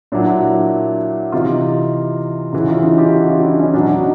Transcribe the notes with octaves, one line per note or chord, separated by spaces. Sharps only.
A#2 F#3 D4 E4
C3 E3 D#4 F4
C#3 E3 E4 F#4
D#4 F4
C#4 D#4
F4 G4
E4 F#4
D#4 F4
D4 E4
C#4 D#4
B2 F#3 D4
D#4